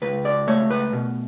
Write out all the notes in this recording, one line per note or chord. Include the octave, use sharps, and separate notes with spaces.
C#2 B4
D5
A3 C#5
B4
B2